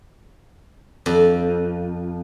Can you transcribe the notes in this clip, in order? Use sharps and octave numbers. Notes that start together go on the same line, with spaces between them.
F2